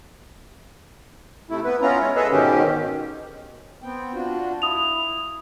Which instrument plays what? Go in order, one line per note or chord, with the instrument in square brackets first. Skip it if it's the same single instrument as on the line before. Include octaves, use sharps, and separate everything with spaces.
[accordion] C3 A3 E4
B3 B4
B3 C#4 E4 F4 A#5
G#3 C#5
G#4 A4 B4 D#5 E5
G#2 B2 D#3 C#4 G4
[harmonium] B3 C4 G5
D4 F4 F#4
[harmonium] E4 [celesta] D#6 F7